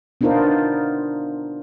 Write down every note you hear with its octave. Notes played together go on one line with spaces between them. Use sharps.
B3 D4 D#4 F4 A#4 C5